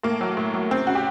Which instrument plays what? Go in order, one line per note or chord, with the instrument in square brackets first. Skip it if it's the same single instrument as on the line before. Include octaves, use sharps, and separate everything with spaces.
[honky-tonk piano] A2 A#3
F#3
A2
F#3
C#3 C4
C#3 F#4
G4